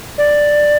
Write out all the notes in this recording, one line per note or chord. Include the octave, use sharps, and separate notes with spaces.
D5